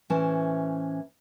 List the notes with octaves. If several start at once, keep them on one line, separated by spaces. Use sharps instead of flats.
A2 E3 C#4 C5 A5